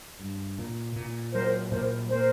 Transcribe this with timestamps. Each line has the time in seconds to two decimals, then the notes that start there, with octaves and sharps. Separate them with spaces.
0.20 G2
0.59 A#2
0.96 A#2
1.33 F#3 A#4 C5
1.72 A#2 A#4 C5
2.10 A#3 A#4 C5